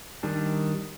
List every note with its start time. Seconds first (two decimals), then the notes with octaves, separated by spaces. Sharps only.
0.23 D#3 G3 D4